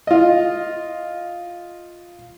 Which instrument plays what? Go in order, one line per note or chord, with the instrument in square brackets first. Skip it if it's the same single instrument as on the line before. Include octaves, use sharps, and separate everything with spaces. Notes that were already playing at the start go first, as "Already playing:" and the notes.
[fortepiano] F4 D#5